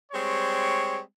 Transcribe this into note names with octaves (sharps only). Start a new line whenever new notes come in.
G3 G#3 C4 C#5